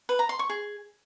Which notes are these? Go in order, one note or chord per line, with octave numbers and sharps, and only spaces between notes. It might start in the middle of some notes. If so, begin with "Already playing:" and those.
B4
A#5
C6
C#6
G#4